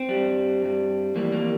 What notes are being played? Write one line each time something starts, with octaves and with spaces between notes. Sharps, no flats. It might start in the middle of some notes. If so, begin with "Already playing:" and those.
Already playing: C4
G2 G3
G2 G3
F2 E3 G3 A#3
A#3